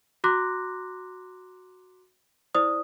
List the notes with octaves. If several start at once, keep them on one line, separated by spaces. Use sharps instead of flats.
F#4 A#5 C6 D6 F#6 A#6
E4 C5 D5 D#6